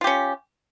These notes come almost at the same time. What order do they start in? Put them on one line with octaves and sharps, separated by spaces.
F4 G4 C#4